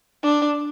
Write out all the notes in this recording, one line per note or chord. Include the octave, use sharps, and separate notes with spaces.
D4